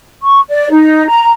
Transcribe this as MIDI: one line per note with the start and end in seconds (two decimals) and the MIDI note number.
0.22 0.40 85
0.48 0.68 74
0.70 1.07 63
1.08 1.30 82